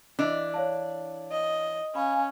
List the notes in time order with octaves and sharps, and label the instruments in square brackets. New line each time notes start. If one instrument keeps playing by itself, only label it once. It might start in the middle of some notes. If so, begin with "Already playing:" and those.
[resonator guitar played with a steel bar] E3 D4 [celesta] D#5
[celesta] C#5 F5 A5
[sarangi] D#5
[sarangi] C#4 [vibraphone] F5 G#5 [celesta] B5